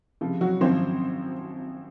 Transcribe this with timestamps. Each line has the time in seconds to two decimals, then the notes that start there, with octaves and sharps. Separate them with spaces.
0.21 C#2 C3 F3
0.41 F#3 F#4
0.61 G#1 F#2 F3 C4 C5